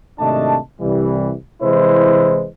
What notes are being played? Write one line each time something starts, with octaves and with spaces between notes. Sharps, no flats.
G#1 C3 A3 D4 D#5 A5
C2 E3 G3
C3 E3 G#3 E4 B4 C5